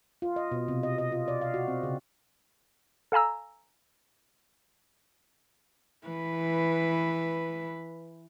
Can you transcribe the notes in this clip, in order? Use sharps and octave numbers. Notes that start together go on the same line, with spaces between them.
F4
D#5
B2
C3
D#5
D#5
F4
D5
F5
F#4
C4
C#3
A4 F5 G#5 A#5 E6
E3 B4